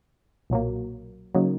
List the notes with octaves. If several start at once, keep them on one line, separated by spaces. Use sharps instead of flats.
B1 A#2 F#3 A#3
C#3 F#3 A#3 D#4